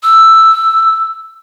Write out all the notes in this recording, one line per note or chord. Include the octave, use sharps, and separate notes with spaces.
E6